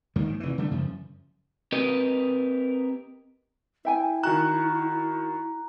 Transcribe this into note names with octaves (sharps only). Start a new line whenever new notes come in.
D#2 G#2 D#3 G3
D#3
F1 E3
D3 G3 A3
F#2 C#3 F3
C4 G4 A#4 B4 D#5
E4 E5 G5 G#5
D#3 F#4 A#5 F#6